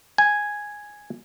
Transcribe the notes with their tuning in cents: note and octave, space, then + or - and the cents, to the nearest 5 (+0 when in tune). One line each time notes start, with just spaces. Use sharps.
G#5 +0